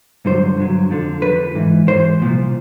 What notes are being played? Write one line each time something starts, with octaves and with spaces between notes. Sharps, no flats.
G2 D3 F#3 C5
G2 D3 F#3
F2 D3 F3
F2 D3 F3 B4
G#2 E3
G#2 E3 C5
C2 A#2 F3